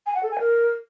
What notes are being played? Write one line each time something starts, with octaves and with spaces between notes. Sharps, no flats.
G#5
F#5
A4
G#5
A#4